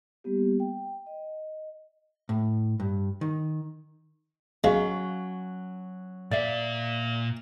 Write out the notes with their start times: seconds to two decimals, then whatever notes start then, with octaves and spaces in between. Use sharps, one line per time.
0.24 G3 A#3 B3 G4
0.60 G5
1.06 D#5
2.29 A2
2.80 G2
3.21 D#3
4.64 F#3 G#3 C#4 F5
6.31 A#2 D5 E5 F5